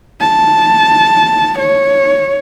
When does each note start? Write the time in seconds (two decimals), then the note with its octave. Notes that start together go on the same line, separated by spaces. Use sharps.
0.21 A5
1.59 C#5